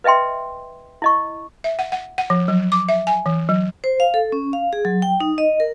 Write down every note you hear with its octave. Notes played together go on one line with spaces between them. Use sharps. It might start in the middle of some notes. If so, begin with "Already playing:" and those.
B4 D#5 E5 G5 C6
E4 D#5 C#6
E5
F#5
F#5
F#5
F3
F#3
D6
E5
G#5
E3
F#3
C5
F5
A4
C#4
F5
G#4
F#3
G5
D#4
D#5
A#4